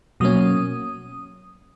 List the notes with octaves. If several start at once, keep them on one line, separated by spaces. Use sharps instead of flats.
B2 F#3 A#3 C#4 D#6